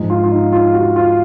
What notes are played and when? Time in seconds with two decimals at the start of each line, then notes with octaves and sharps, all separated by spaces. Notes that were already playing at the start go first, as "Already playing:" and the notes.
Already playing: G#2 F3 G#3 D#4
0.10 F4
0.24 F4
0.32 D#4
0.52 F4
0.74 F#4
0.96 F4